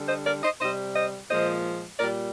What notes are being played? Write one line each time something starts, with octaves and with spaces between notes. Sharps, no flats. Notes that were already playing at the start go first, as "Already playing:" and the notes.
Already playing: D3 G3
C5 D#5
A#4 D5
C5 D#5
C3 G3 C5 D#5
C5 D#5
A#2 F3 G#3 C5 D#5
A#2 G3 A#4 D5